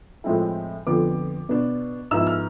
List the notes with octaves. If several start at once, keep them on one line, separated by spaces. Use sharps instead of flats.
A2 F3 G#3 C4 E4
F2 D3 F3 B3 D6
B2 B3 D4
G#2 F3 B3 E4 E6
F6